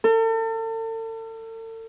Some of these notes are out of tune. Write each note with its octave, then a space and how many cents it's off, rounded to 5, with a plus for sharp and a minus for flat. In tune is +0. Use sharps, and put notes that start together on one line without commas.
A4 +40